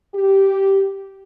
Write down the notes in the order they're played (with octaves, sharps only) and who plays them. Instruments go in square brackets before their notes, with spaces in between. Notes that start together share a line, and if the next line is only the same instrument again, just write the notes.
[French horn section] G4